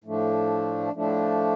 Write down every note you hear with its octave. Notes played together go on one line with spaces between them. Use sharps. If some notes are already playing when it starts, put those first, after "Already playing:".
A2 F3 A3 D4
A2 F3 A3 D4